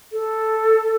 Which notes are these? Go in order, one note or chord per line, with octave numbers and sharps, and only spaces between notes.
A4